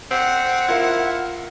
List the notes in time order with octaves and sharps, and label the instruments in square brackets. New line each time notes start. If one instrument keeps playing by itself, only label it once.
[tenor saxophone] C4 [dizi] F#5
[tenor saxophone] E4 [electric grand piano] F4 A#4 F5